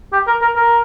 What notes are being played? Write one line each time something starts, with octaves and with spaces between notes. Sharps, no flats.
G4
A#4
A#4
A#4